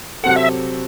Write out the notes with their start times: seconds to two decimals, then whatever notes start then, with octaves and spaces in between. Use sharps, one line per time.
0.23 C3 F#3 C4 F#4 A4 F#5
0.36 E5